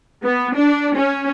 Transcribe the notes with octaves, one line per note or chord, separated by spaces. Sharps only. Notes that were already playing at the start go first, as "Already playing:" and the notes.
B3
D4
C#4